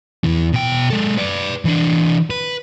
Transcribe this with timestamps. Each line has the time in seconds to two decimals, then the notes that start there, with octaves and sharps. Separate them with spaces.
0.24 E2 E3
0.53 B2 G5
0.90 G#3 A4
1.17 B4 D5
1.65 E3 D4
2.30 B4